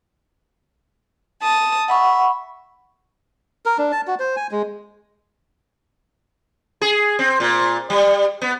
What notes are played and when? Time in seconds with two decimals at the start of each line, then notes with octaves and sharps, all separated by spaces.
1.41 A5 D#6
1.88 E5 F#5 B5 C#6
3.66 A#4
3.78 D4
3.92 A5
4.07 F#4
4.19 C5
4.36 G#5
4.51 G#3
6.81 G#4
7.19 C4
7.40 A#2
7.90 G3
8.42 B3